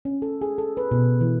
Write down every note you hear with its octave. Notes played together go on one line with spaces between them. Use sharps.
C#4
A4
G#4
A4
B4
B2
E3